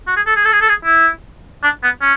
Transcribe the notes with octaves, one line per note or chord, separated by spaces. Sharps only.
F#4
G#4
A4
G#4
A4
G#4
A4
G#4
E4
D4
B3
C#4